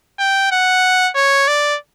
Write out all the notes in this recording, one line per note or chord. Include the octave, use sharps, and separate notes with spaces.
G5
F#5
C#5
D5